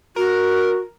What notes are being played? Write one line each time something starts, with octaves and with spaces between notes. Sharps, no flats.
F#4 A#4